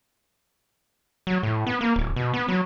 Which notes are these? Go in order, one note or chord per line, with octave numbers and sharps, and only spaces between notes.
F#3
A2
B3
A#3
D1
B2
B3
F#3